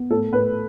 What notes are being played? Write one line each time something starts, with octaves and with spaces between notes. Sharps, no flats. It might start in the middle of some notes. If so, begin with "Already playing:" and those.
Already playing: B3
A2 A4
A2 B4